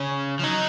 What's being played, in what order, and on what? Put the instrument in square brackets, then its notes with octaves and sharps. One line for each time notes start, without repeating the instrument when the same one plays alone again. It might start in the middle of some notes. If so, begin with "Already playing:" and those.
Already playing: [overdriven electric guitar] C#3 [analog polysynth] C#4
[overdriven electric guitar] F3
[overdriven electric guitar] F#3 [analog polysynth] D#4